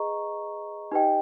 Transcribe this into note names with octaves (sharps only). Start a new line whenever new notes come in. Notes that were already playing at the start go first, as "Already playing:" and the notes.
Already playing: G#4 B4 D#5 A#5 C#6
D#4 G4 B4 D#5 G5